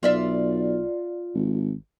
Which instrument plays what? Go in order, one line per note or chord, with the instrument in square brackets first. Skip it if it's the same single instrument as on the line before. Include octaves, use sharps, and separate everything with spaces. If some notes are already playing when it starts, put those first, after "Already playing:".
[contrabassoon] B1 [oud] F4 D5 E5
[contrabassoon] G#1